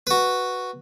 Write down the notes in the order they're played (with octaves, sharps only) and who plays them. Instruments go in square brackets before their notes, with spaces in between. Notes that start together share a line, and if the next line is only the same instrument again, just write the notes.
[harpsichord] F#4 B4